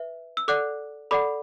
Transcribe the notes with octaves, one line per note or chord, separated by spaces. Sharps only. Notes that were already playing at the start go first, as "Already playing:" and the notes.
Already playing: B4 E5
E6
A4 D5 F#5 D6 F#6
A4 D5 F#5 B5 D6